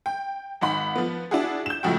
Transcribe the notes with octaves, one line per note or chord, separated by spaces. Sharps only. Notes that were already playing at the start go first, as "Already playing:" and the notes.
G5
G#1 D#4 F#5 B5
F3 B3
D4 E4 F#4 G#4
G6 E7
C#2 A2 C#3 F3 F#4 G5